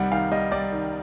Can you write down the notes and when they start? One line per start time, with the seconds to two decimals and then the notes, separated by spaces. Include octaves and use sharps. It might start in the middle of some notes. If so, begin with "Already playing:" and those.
Already playing: C2 C3 D#3 G3 F#5
0.12 D#3 F5
0.31 G3 D#5
0.52 G3 D5
0.71 D#3